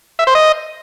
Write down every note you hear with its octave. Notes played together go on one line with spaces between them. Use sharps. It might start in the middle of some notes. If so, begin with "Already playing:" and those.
E5
C5
D#5